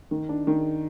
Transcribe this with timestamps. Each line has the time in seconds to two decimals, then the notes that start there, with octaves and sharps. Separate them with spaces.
0.11 D#3
0.29 D4
0.47 D#3